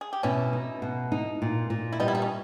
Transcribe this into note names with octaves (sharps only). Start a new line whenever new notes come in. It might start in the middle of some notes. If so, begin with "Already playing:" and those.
G#4
G4
B2 C#4 E4
D#4
B2
D#4
A#2
A#2
E4
G3 B3 D#4
E4
D#4
C#4